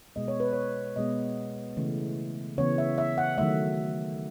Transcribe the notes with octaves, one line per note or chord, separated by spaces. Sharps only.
B2 G#3 B3 D#5
C#5
B4
C#5
B2 G#3 B3 D#5
C#3 E3 A3
C#3 E3 B3 C#5
E5
E5
F#5
D#3 F#3 A3 E5